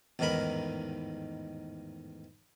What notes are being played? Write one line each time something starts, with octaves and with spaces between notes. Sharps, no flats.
A1 E2 G#2 D#3 A#4 B5